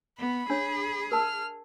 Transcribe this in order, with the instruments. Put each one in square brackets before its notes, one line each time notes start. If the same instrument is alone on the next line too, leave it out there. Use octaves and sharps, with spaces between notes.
[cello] B3 [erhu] B5
[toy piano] D4 C#5 [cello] G#4
[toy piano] A#4 A5 E6 [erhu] F6